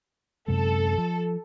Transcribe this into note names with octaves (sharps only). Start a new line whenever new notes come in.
F#2 C3 G#3 A4
F3